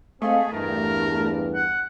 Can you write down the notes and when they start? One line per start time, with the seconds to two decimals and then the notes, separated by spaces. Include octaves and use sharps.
0.22 A3 C4 G#4 D#5 F5
0.52 E2 G2 A#4
1.54 F#5